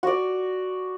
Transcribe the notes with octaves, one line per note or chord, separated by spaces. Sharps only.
F#4 D5